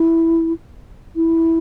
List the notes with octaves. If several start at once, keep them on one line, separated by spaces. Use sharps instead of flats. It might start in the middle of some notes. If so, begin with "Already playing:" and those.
Already playing: E4
E4